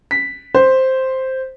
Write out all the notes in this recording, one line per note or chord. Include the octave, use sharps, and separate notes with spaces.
B6
C5